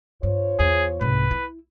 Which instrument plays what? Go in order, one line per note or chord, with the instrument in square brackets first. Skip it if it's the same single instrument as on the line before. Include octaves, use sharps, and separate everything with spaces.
[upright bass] G2 [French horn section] F4 C5 C#5
[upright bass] E2 [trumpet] G#4
[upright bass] C2 G#2 [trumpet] B4
[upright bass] E4